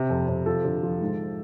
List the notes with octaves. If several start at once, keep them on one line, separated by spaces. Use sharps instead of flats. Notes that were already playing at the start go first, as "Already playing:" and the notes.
Already playing: C3
F2
C3
F3 A4
D3
F3
G#2